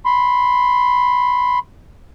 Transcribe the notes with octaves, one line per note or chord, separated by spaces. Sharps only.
B5 C6